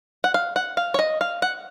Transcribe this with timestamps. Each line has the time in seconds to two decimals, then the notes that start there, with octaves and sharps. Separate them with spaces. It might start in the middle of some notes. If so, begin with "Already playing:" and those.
0.24 F#5
0.34 F5
0.56 F#5
0.77 F5
0.94 C#5
0.99 D#5
1.21 F5
1.42 F#5